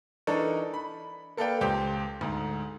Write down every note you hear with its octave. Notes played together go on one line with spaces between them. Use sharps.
E3 D4 D#4 A4 A#4 C#6
B5
A#3 A4 B4 D5 F5 G5
C#2 G4 C5 G5
D2 G#2